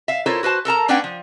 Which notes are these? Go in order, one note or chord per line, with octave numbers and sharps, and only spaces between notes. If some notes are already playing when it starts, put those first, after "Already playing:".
E5 F5
E4 F4 A4 A#4 C5 C#5
F#4 B4 C5 A5
A4 A#4 A5 A#5
A#3 C#4 D4 B4 F#5 G5
F3